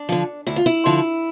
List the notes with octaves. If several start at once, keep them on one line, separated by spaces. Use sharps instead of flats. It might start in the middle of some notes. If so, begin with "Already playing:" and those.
Already playing: D4
D3 F3
D2 E4
F4
E4
D3 F3